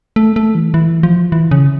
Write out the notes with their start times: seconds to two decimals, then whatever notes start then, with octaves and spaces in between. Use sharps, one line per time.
0.16 A3
0.36 A3
0.55 E3
0.74 E3
1.03 F3
1.32 E3
1.51 C#3